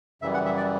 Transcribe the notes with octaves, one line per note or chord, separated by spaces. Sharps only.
F#2 C#3 E3 G3 E5
F#5
E5
D5